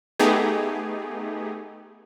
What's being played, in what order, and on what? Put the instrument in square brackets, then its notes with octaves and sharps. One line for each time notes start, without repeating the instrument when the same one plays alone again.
[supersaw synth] A3 B3 D#4 G4 G#4